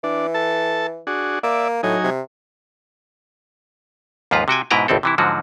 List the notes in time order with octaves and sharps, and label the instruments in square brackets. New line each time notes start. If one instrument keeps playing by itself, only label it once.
[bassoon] E3 [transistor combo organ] D4
[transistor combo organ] A4 A5
D4 F#4 G#4
[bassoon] A#3 [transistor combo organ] D5 E5
[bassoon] A2 [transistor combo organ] F#3 D#4 G#5
[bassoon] C3
[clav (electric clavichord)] D#2 G#2 F3 F4 B4 A#5
C3 F#4 G5 G#5
G#2 B2 E4 B4 G5 A#5
G#1 C#2 A2 C4 A4
C3 E3 E4
G#2 D3 F3 F#3 F#4